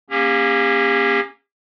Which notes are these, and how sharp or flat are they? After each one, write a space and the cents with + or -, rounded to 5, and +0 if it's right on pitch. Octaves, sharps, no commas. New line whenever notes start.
A#3 +10 C#4 -15 G4 +45